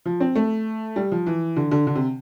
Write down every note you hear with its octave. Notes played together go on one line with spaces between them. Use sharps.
F3
C4
A3
G3
F3
E3
D3
D3
D3
C3